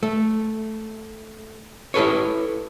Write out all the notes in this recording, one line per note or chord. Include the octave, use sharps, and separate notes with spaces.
A3
E4 G4 A4 B4 C#5